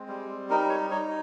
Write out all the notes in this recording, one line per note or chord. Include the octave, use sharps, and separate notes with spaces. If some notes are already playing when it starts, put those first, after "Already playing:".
Already playing: G#3 C4
G3
D#4 A#4
C#5
D#4 C#5